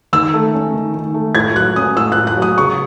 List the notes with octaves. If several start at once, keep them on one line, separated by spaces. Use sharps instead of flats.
D#3 E6
A3
C#4
D#3
D#3
A3
A2 G#6
F#3 F#6
C#4 D#6
A2 E6
A2 F#6
F#6
F#3
D#6
C#3 C#6